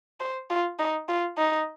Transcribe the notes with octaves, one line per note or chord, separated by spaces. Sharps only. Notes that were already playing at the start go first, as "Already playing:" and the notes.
C5
F4
D#4
F4
D#4